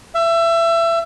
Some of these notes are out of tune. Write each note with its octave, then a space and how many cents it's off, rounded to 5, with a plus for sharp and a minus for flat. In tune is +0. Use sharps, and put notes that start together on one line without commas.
E5 +25